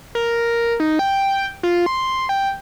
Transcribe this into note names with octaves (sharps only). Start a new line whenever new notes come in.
A#4
D#4
G5
F4
C6
G5